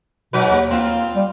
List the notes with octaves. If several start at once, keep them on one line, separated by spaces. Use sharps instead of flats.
G#2 B2 F#3 B4
D#2
A#3 C4 F4
G3